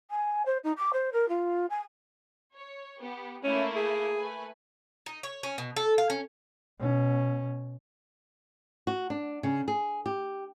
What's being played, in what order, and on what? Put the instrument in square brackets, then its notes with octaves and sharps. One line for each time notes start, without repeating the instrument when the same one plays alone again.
[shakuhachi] G#5
C5
D#4
D6
C5
A#4
F4
G#5
[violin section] C#5
B3 G4
[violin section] A3 A#3 E4 [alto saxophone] C#4
[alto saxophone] G#4
[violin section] A3 B4 G#5
[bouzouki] D#4
C#5
C#4
B2
A4
F5
C#4
[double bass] B2 C#4
[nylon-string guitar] F#4
D4
C#3
G#4
G4